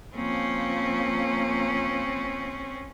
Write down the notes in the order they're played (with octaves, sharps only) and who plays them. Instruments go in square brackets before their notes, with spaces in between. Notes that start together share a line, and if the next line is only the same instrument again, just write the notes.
[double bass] F3 A#3 [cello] C4 C#4